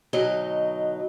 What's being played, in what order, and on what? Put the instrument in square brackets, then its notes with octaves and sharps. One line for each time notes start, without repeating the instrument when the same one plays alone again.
[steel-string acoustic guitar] D2 B2 F#3 D#4 D#5